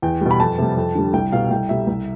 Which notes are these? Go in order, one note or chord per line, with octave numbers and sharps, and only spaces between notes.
E2 G5
B2 G3
B5
F2 A5
C3 G3
F2
D3 G3
C2 G5
B2 G3 F5
C2 G5
B2 G3 E5
C2